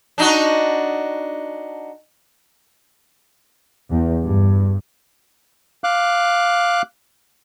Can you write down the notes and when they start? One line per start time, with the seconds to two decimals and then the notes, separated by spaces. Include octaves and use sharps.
0.18 D4 D#4 F#4
3.90 E2
4.23 G2
5.84 F5 D6 F#6